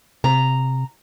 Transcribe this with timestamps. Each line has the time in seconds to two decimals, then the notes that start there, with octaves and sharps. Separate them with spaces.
0.24 C3 A#5